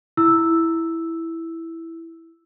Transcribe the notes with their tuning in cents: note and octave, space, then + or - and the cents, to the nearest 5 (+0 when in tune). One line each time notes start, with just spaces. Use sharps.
E4 +0 E6 +0